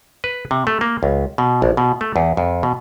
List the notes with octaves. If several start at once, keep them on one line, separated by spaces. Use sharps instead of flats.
B4
C3
A3
A#3
C#2
B2
A#1
B2
A3
E2
F2
B2